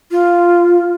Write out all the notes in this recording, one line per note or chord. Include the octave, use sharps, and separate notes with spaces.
F4